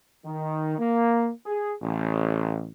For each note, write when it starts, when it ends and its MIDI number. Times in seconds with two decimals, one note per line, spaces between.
0.24 0.77 51
0.79 1.29 58
1.46 1.73 68
1.82 2.69 33